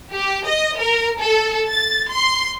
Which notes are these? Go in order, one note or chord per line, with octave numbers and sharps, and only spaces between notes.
G4
D#5
A#4
A4
A6
C6